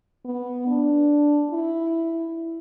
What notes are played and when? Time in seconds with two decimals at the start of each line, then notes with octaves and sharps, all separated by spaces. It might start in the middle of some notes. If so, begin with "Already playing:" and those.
0.25 B3
0.67 D4
1.51 E4